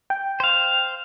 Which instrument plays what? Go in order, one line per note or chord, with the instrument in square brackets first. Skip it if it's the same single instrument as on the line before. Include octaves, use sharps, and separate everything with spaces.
[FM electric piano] G5
[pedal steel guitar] C5 F5